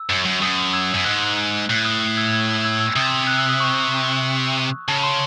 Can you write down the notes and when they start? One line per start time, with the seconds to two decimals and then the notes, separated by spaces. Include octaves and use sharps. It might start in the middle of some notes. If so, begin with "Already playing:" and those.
Already playing: E6
0.10 F#2
0.25 F#2
0.42 F#2 D#6
0.73 E6 G#6
0.94 F#2
1.05 G#2 F#6
1.69 A2 F#6
1.85 D#6
2.17 E6 G#6
2.33 E6 G#6
2.64 E6 G#6
2.80 E6
2.96 C3 D#6
3.27 F#6
3.38 E6
3.49 D#6
3.60 C#6
4.88 C#3 A5
5.03 C6